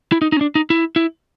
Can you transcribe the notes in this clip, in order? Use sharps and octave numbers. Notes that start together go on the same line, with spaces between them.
E4
D#4
D#4
C#4
D4
D#4
E4
E4